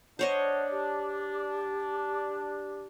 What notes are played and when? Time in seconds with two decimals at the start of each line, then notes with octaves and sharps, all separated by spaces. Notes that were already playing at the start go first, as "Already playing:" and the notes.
0.19 D4 C5 C#5 D#5 F#5
0.71 G4